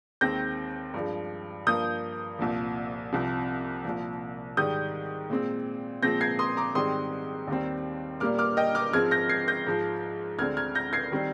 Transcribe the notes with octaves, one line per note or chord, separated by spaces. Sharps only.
D#2 D#3 G#3 C4 G6 A#6
G2 F3 G#3
G2 F3 A#3 D#6 G6
C2 A#2 F3
C2 C3 F3
C2 A#2 F3
G#2 D#3 G3 D#6 G6
A#2 G#3 C4
A#2 F3 G#3 C4 G6 A#6
G#6 C7
C6 D#6
A#5 D6
G#2 D#3 G3 C4 C6 D#6
D#2 D#3 G3 C4
A#2 G3 A#3 D6 F6
D6 F6
D#5 G5
D6 F6
G#2 F3 G#3 C4 F6 G#6
G6 A#6
G#6 C7
G6 A#6
G#2 F3 G#3
D2 D3 G#3 C4 F6 G#6
F6 G#6
G6 A#6
G#6 C7
D#3 G3 C4